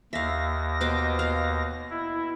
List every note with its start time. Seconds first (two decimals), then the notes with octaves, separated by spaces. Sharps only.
0.13 D#2 E5 F5 A#6
0.80 B2 C5 D6
1.19 F5
1.90 E4